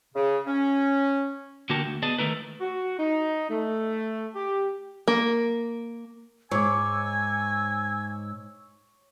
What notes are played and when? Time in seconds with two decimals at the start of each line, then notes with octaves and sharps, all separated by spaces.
0.15 C#3
0.47 C#4
1.70 D3 A#3 F#4 G4 A#4 A5
1.86 D2
2.03 B3 G#4 D5 D#5 A5
2.18 D#3 A3 E4 A#4 B4
2.61 F#4
2.99 D#4
3.50 A3
4.34 G4
5.08 A#3
6.51 G#2 C#5 G#5 D6 E6